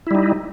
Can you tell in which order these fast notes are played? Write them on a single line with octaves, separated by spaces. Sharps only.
E4 G3 D#4